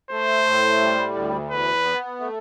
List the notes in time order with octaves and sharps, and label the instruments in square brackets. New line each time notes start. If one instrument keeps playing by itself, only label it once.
[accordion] A3 [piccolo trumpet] C5
[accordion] A2
G3
D2
[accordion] E2 [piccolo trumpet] B4
[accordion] B3
A3